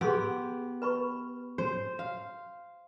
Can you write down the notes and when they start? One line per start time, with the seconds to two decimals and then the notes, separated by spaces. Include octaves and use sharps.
0.01 B3 G4 G#4 C6 E6
0.82 B4 B5 C#6
1.58 C5
1.99 F5